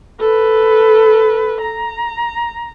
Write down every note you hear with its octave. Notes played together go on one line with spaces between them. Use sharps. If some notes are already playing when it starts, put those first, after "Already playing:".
A4 B4
A#5